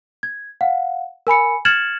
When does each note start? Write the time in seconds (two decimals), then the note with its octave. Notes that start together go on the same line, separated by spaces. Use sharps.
0.23 G#6
0.61 F5 F#5
1.27 A#4 G#5 B5 C#7
1.65 F6 G#6 A6 C#7 E7 F#7